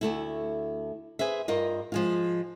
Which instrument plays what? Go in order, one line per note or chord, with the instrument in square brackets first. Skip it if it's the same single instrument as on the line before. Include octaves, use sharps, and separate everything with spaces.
[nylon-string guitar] D2 A3 E4
G#4 B4 C5 E5
G2 F4 A#4 D#5
F3 G#3 F4